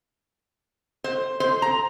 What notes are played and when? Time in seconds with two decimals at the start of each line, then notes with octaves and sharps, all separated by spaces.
1.04 C5
1.40 C5
1.62 A#5